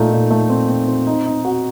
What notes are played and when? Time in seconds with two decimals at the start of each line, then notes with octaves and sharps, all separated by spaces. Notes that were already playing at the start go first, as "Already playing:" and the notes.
Already playing: A#2 A3 D#4
0.12 A#2
0.31 A3
0.49 C4
0.69 C4
0.88 C4
1.07 D#4
1.26 D#4
1.45 F#4